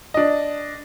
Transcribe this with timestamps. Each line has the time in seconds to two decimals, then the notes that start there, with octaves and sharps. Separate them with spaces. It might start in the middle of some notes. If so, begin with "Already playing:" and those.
0.14 D4 D#5